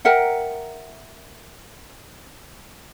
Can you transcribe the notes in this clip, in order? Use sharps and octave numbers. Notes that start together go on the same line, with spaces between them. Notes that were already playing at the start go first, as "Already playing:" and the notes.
A#4 E5 F#5 G5